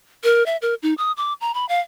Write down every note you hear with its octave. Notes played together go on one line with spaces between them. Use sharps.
A#4
E5
A#4
D#4
D#6
D6
A#5
B5
F5